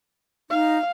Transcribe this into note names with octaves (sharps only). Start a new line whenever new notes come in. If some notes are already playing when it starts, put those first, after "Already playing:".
D#4 F5